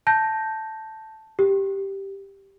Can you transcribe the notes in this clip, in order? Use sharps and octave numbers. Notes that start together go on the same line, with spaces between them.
A5 G6 A#6
G4